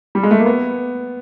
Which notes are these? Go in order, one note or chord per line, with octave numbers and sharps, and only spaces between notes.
G3
G#3
A3
A#3
B3